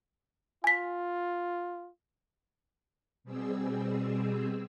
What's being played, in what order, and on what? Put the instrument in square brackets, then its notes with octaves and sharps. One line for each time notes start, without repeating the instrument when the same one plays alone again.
[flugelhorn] F4 [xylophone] G#5 B6
[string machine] B2 G3 C4 G#4 E6